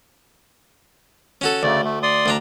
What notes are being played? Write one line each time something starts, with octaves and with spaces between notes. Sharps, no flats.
C#4 F#4 A4
D2 C#3 A3 D5
A3
D5 C6 D#6
D2 D4 A#5